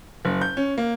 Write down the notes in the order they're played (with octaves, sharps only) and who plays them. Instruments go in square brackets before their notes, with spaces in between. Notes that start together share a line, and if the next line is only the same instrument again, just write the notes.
[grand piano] F#1
G6
C#4
A#3